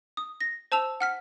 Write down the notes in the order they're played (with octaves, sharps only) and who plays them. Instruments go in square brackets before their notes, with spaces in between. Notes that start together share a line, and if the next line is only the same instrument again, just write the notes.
[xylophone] D#6
A#6
C5 A5 E6 F7
F#5 F6 B6